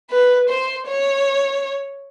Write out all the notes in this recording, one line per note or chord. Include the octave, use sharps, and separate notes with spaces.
B4
C5
C#5